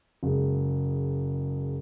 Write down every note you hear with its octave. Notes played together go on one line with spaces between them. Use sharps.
F#1 G#3